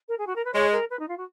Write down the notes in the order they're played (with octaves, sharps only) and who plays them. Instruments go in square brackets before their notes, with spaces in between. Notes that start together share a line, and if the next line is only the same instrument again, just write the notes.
[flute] A#4
G#4
F#4
A#4
B4
[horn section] G#3 [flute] C#5
[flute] A#4
B4
D#4
F4
F#4